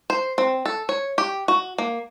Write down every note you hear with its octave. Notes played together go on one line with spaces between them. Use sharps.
C5
C4
A4
C#5
G4
F#4
A#3